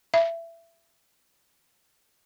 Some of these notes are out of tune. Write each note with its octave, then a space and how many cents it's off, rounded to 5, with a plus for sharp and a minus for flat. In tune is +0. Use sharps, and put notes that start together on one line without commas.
E5 +20